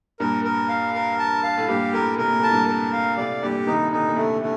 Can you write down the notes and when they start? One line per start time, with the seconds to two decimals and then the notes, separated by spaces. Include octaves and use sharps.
0.20 G2 A#2 A#4
0.44 A#4
0.69 F5
0.94 A#4
1.19 A5
1.43 F5
1.58 A2
1.68 G2 A#2 G4
1.93 A2 A#4
2.18 C3 A#4
2.29 A#2
2.40 A2 A5
2.51 G2 A#2
2.68 A#4
2.93 F5
3.17 A2 C3 D5
3.42 G2 A#2 G4
3.67 C3 D#3 D#4
3.92 A#2 D3 D#4
4.08 A#2
4.16 A2 C3 A3
4.42 D3 A3